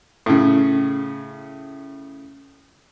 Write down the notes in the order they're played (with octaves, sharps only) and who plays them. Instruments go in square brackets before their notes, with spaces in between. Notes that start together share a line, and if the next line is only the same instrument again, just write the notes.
[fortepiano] A2 C#3